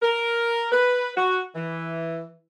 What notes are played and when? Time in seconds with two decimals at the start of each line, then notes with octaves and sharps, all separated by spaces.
0.02 A#4
0.72 B4
1.16 F#4
1.55 E3